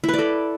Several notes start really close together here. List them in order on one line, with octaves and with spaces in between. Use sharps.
E4 B4 D5 A4